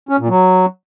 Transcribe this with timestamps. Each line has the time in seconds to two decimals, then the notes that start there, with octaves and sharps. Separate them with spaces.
0.09 C#4
0.19 A#2
0.28 F#3